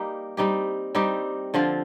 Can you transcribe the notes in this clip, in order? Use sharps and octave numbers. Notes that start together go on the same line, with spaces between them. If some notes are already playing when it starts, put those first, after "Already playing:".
Already playing: G3 A#3 D#4 G4
G3 C4 D#4 G4
G3 C4 D#4 G4
D3 F3 C4 F4